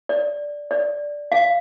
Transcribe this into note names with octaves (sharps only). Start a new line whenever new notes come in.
D5
D5
F5